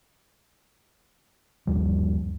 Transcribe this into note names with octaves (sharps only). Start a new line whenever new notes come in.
G1 D#2 F3 G3